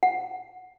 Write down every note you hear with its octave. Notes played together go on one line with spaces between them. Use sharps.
F#5